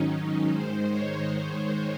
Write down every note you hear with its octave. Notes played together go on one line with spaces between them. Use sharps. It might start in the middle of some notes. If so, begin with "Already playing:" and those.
Already playing: G#2 D#3 F#3 C#4 D#4
D#4
G#2 D#3 G#3 C5
C#5
C#5